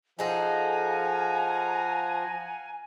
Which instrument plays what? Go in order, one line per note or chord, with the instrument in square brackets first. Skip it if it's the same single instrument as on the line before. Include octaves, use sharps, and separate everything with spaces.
[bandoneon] F3 [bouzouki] D#4 G#4 A4 [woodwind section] F5 F#5 A#5 [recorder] G#5